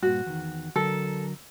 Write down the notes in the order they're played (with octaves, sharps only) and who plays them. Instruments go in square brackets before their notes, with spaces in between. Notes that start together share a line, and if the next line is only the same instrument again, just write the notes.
[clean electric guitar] G2 A#2 [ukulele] F#4
[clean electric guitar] E2 D#3
[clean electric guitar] D3 F#3 A#4 [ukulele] A4